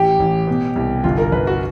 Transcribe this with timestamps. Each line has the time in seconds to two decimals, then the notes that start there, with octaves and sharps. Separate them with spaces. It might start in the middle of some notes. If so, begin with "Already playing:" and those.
Already playing: A1 G4
0.20 A1
0.47 B2
0.76 C2
1.04 G1 F4
1.18 A#4
1.32 G1 B4
1.47 F#4